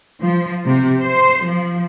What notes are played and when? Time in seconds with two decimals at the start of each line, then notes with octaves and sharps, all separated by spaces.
0.21 F3
0.65 C3
1.01 C5
1.46 F3